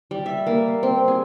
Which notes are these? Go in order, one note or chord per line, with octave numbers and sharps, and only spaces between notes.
G3
E5
A#3
C4
G#4